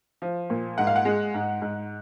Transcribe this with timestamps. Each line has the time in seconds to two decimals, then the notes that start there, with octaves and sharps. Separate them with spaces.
0.22 F3
0.50 A#2
0.78 G#2 F#5
0.87 F5
0.96 F#5
1.05 G#3
1.34 G#2
1.62 G#2